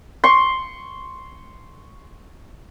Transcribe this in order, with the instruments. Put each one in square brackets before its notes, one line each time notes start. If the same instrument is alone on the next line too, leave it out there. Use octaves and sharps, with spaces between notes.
[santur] C6 C#6